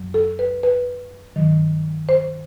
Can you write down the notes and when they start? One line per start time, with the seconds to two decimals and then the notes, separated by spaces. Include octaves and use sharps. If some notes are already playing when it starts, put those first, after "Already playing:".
Already playing: F#2 F#3
0.14 A4
0.39 B4
0.63 B4
1.36 G2 D#3 F#3
2.09 C5